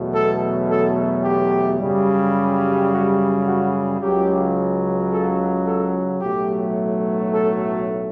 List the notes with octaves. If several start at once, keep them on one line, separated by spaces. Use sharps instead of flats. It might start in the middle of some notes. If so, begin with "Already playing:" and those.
Already playing: E2 B2 F#3 A3
A4
A4
G4
F#2 C#3 G3
F#4
F#4
C#2 C#3 F#3 G4
A4
A4
B1 A2 F#3 A3 G4
A4